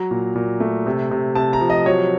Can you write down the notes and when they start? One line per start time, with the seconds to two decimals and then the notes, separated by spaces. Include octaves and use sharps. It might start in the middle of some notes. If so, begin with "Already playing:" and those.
Already playing: F#3 A#5
0.11 A#2
0.35 A#2
0.60 A3
0.86 C3
1.11 C3
1.35 C3 A5
1.53 A#5
1.61 F3
1.70 D#5
1.86 F#3 C#5